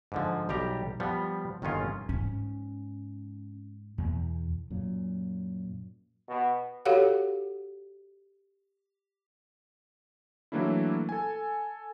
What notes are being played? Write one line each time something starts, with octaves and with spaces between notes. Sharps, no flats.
G#2 D3 F3
B1 G3 G4 A#5
F3 G3 B3
G1 D#3 F#3 C#4 F4
G#2 C#4
E2 B2
F#2 A#2
B2
F#4 G4 A4 C#5 F5 F#5
E3 F#3 A3 A#3 D4 E4
A4 G#5